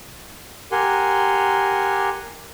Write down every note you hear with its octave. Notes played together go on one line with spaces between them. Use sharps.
G4 A#4 F#5 G#5 C6